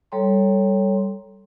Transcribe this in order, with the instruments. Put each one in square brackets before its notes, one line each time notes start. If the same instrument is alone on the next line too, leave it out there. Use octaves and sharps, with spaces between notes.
[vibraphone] G3 A4 C#5 G5 A#5 C6